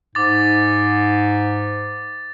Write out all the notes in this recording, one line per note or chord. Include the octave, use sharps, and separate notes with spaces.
G#2 D6 A6